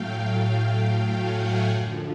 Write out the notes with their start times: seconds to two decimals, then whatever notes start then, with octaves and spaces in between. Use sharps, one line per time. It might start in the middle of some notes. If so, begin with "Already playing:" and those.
Already playing: A2 F#3 A3 F5 G5
1.12 F#5 G#5
1.68 F#2 D3 F3